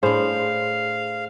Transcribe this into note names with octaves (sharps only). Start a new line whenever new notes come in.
A2 D4 G#4 C5 F5